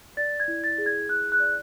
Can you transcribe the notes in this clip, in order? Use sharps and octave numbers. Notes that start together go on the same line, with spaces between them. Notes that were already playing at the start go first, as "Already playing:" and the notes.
D5 A6
G#6
E4
A6
G#4
G#6
E4 F#6
F#6
D5